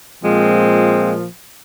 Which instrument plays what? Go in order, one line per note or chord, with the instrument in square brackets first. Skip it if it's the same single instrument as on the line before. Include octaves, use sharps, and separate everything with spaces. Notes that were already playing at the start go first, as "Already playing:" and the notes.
[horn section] A#2 F3 G#3 C4